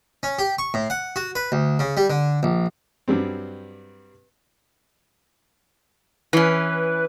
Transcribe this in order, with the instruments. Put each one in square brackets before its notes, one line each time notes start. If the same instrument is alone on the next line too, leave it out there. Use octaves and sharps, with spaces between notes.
[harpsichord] C#4
G4
C#6
A2
F#5
F#4
B4
D2
C#3
G3
D3
A#1
[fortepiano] G2 F#3 G3 C4
[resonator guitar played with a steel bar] E3 C#4 [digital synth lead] B4